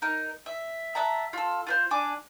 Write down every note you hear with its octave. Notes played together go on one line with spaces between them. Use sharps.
D#4 A#4
E5
E5 F#5 A5 A#5
F4 A4
F4 B4 C5
D4 G#5 D6